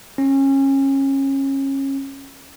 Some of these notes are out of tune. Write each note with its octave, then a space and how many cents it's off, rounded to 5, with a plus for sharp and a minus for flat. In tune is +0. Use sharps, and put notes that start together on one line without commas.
C#4 -25